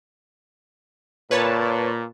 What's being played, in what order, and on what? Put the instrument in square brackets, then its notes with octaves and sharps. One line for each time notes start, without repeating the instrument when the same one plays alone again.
[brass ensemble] A#2 [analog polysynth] B4 C#5 A5